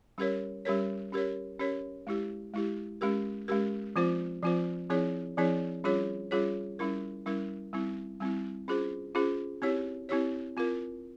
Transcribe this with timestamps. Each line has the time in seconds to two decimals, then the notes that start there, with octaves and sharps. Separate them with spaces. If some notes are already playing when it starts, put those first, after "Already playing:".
0.18 G3 C#4 G4 A#4 C#5
0.65 G3 C#4 G4 A#4 C#5
1.12 C#4 G4 A#4 C#5
1.60 C#4 G4 A#4 C#5
2.07 G#3 E4 G4
2.54 G#3 E4 G4
3.01 G#3 C#4 G4 A#4
3.48 G#3 C#4 G4 A#4
3.96 F3 C4 F4 C5
4.43 F3 C4 F4 C5
4.90 F3 C4 E4 G#4 C#5
5.37 F3 C4 E4 G#4 C#5
5.84 G3 C#4 F4 G#4 C#5
6.31 G3 C#4 F4 G#4 C#5
6.79 G3 C#4 E4 A#4
7.26 G3 C#4 E4 A#4
7.73 G3 C4 E4
8.20 G3 C4 E4
8.68 C#4 F4 G#4 C5
9.15 C#4 F4 G#4 C5
9.62 C4 E4 G4 C#5
10.09 C4 E4 G4 C#5
10.57 C4 F4 A#4